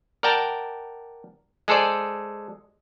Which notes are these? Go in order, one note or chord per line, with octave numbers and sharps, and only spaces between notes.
A#4 D5 F#5 G5 A5 A#5
G#3 G#4 A4 C5 D5